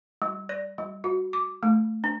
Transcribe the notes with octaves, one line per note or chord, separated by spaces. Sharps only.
G3
D5
G3
F#4
D6
A3
D4